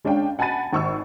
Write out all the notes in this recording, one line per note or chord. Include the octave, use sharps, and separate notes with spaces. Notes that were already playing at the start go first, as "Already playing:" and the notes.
G#3 C#4 D4 F5 G5
F#5 G#5 A5 B5 A6 D#7
G#1 C#6 E6